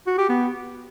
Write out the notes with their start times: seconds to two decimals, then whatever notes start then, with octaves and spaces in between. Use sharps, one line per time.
0.07 F#4
0.18 G4
0.29 B3